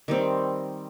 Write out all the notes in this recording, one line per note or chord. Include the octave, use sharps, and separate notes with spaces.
D#3 G3 C4